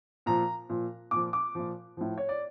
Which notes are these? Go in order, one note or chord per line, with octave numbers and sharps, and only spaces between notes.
A#2 F3 A#5
A#2 F3
A#2 F3 D6
D6
A#2 F3
A2 F3
C#5
D5